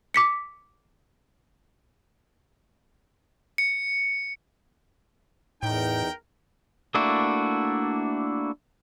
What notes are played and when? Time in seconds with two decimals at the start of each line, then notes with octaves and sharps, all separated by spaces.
0.14 D6 B6 C#7
3.58 C#7
5.63 E2 A2 D#4 A#4 G5
6.95 A3 A#3 D4 E4 F#4